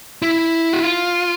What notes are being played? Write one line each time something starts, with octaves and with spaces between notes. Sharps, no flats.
E4
F#4
F4